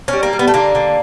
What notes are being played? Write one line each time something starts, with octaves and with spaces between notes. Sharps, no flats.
G3 C#4
A#3
G3
B3
A3
D3 A#3
D3